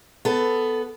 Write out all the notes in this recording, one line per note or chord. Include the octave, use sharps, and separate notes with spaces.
B3 A4